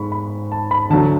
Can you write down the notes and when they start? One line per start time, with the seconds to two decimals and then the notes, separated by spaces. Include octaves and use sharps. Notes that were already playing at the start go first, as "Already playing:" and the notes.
Already playing: G#2 G#3 B5 C#6
0.12 B5
0.52 A5
0.71 B5
0.90 D2 D3 F#3 A5